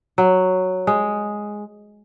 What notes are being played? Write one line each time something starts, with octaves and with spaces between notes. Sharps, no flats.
F#3
G#3